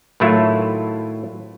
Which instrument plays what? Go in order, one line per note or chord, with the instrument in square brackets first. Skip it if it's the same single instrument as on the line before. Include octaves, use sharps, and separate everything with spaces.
[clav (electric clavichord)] A2 D#3 F#3 A3 E4 F4